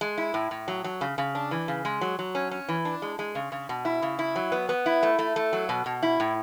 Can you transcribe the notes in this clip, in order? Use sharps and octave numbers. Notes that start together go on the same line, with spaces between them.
G#3
E4
A2
A2
F#3
F#3
C#3
C#3
D4
E3
C#3
G#3
F#3
F#3
C#4
C#4
E3
D4
G#3
G#3
C#3
C#3
B2
E4
C#3
E4
F#3
B3
B3
E4
A3
A3
A3
F#3
B2
B2
E4
A2